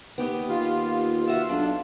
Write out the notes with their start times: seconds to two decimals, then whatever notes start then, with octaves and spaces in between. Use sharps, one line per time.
0.18 D#2 B3 G4 D#5
0.49 D#2 F4
1.27 F#4 E5
1.49 B1 D4